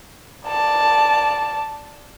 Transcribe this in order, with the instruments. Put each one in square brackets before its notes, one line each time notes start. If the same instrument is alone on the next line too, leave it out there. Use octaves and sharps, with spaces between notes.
[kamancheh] D5 A5